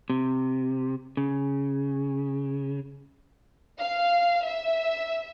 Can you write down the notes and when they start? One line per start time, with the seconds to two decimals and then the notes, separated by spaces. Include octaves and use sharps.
0.10 C3
1.17 C#3
3.80 F5
4.45 E5